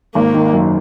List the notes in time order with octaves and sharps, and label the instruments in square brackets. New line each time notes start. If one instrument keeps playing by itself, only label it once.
[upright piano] G#1 [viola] A#3
[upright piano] D#3
F#2